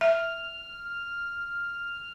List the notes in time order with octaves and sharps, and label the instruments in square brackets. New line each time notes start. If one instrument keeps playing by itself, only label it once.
[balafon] E5 [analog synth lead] F6